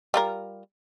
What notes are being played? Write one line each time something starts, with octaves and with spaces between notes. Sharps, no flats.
G3 F4 A#4